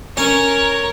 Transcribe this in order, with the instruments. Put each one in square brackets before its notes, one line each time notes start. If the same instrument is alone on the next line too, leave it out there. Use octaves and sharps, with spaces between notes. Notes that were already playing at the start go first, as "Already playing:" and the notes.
[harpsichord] C#4 [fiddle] A#4 C#5